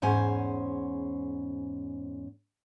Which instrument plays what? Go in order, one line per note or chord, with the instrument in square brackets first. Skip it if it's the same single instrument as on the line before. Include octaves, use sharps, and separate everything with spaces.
[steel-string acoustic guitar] E2 G#2 C#4 C5 G#5